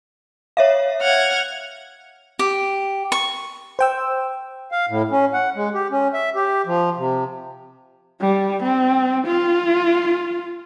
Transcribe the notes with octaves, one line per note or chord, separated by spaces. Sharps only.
C#5 E5 F5
F#5 F6 G#6
G4
C#6
C5 G5 E6
F5
A2
C#4
F#5
G#3
G4
C#4
E5
G4
F3
C3
G3
C4
F4